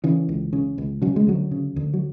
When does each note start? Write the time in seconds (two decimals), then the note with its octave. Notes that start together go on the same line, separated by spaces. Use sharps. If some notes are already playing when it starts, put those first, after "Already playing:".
0.04 C#3 E3
0.29 C#2
0.53 C#3
0.78 C#2
1.02 C#3 F#3
1.16 G#3
1.27 D2 F#3
1.51 C#3
1.76 D2
1.94 F#3